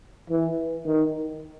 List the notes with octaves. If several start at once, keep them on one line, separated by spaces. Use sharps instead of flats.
E3
D#3